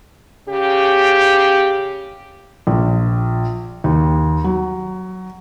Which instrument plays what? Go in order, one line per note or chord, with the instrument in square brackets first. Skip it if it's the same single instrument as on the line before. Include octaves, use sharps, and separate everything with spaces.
[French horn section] C#3 G4
[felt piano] A#1
D#2
F#3